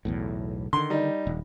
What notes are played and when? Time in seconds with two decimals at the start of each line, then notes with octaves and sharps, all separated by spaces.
0.05 B1 E2 A2
0.73 D3 D#3 C6
0.90 G3 D#4
1.27 D#1